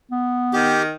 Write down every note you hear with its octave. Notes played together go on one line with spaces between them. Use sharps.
B3
D#3 G4